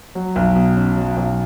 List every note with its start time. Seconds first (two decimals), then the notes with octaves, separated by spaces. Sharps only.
0.15 F#3
0.36 B1
0.56 B2
0.76 C#4
0.97 F#3
1.17 B1